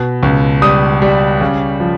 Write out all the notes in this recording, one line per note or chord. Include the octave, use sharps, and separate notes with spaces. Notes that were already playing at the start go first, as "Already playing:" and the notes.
Already playing: B2
C#2
G3 D#6
G3
C#3
F3